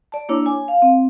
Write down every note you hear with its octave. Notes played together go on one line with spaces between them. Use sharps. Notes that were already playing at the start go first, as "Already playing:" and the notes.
D5 A5
A#3 D4 E4 C#5 D6
G#5
F5
C4